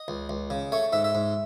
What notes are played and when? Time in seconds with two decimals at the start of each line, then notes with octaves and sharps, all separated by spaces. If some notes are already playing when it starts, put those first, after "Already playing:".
Already playing: D#5
0.08 C#2
0.29 C#2
0.50 C#3
0.72 A3 C#5
0.93 G#2 E5
1.04 E5
1.15 G#2